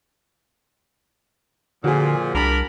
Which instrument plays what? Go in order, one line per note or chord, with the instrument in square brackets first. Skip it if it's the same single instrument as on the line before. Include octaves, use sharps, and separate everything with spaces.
[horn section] A#2 F3 [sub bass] D3 [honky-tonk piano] F#4 G#4
[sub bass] C2 [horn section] D4 A#4 B5